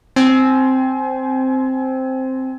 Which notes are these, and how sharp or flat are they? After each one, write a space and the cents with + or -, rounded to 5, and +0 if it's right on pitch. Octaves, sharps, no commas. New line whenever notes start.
C4 +0 C5 +0 G#5 +30